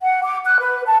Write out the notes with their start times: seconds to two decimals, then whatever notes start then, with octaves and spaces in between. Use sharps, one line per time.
0.02 F#5
0.24 D6
0.45 F#6
0.60 B4
0.86 A5